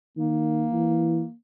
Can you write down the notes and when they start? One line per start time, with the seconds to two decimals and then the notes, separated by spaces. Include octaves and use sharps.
0.17 D#3 A#3
0.73 E3